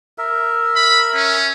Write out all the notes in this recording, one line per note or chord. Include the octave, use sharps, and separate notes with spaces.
A#4 E5
B5
C#4